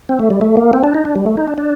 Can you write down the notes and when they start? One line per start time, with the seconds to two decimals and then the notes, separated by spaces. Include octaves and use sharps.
0.09 C4
0.19 A3
0.30 G3
0.41 A3
0.57 A#3
0.73 C4
0.84 D4
0.94 D#4
1.05 D4
1.16 G3
1.26 A3
1.37 D#4
1.47 D4
1.58 D4